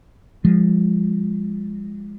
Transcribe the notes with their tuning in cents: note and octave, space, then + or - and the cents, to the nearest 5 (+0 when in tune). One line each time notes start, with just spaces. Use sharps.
F3 +0 G#3 -25